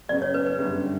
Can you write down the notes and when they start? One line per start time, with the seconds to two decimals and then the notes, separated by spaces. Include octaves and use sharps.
0.09 F#2 C#3 F#3 B3 D5
0.22 C#5
0.34 B4
0.46 B4
0.58 G1 F#2 D3 G3